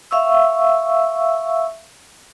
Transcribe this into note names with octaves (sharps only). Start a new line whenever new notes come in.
E5 F5 C#6 E6